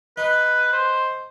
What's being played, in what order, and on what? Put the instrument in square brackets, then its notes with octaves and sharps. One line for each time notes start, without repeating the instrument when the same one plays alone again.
[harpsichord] D#4 [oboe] B4
[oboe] C5